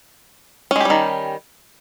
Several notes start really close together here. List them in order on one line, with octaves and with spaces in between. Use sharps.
C#4 G#3 G4 G3 D#3